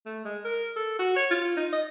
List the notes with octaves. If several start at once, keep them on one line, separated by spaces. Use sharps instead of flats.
A3
G#3
A#4
A4
F#4
C#5
F4
D#4
D#5